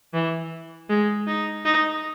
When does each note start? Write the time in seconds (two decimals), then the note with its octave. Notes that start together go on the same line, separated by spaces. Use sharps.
0.14 E3
0.90 G#3
1.27 D#4
1.65 D#4